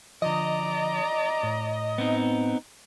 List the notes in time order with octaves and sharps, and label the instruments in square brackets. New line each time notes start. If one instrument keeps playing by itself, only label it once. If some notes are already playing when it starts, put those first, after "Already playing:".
[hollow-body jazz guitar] D3 F3 [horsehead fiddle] D5 A#5 [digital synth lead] D#5
[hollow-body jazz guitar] A2
[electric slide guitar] B3 C4 D#4